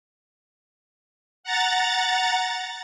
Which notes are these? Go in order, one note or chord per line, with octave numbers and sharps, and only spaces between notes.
F#5 A#5 A6